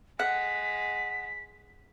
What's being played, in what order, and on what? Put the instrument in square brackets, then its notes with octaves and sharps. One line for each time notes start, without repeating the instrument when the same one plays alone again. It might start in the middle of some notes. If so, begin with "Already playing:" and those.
[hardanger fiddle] G#3 [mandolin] F#5 [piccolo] B6